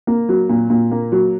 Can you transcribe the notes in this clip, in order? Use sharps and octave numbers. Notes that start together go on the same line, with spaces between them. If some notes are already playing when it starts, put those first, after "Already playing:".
A#3
F#3
A#2
A#2
A#3
F#3